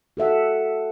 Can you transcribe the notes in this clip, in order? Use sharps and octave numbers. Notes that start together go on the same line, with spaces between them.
F#4 A4 E5 F#5